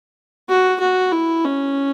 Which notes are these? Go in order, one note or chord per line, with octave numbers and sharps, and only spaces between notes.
F#4
F#4
E4
C#4